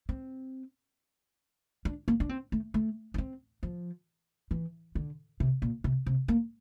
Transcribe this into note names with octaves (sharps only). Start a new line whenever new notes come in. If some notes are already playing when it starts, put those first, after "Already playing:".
C4
D4
A#3
D4
C4
A3
A3
D4
C4
F3
E3
D3
C3
A#2
C3
C3
A#3